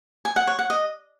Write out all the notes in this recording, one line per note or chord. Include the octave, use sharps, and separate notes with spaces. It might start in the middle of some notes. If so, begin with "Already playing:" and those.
G#5
F#5
C#5
F#5
D#5